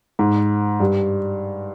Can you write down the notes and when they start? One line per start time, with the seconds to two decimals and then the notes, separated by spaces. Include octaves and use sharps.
0.19 G#2
0.80 G2